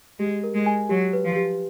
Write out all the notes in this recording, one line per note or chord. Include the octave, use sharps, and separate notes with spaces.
G#3 G4
A#4
G#3
G#5
F#3 G4
B4
F3
G4